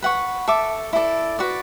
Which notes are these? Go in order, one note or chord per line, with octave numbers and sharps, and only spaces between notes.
B4 F#5 C#6
A4 E5 A5 D6
E4 A4 D5
F#4 B4 D5